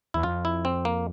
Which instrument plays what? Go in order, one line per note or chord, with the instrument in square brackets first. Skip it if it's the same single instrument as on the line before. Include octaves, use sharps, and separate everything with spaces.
[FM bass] E2 [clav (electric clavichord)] E4
[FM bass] F2 [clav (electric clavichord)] F4
[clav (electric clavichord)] E4
C4
A#3